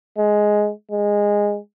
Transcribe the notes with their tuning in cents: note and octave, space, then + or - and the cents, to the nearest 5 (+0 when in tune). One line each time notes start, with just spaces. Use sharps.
G#3 +5
G#3 -15